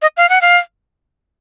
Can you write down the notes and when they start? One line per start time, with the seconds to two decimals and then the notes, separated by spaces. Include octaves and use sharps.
0.02 D#5
0.17 F5
0.29 F#5
0.42 F5